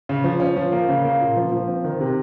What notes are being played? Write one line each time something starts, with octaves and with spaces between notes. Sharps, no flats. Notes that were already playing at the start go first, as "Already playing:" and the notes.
C#3
F3
C#4
F3
A#3
C#3
A#3
A#2
F3
F3
C4
D#3
C3